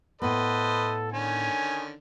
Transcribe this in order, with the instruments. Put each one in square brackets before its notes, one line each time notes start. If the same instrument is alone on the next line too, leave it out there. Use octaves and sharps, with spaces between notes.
[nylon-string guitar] A2 B3 [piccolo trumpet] A4 [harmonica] B4 C5 D#5
[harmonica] D3 D#3 C#4 [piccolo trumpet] G#5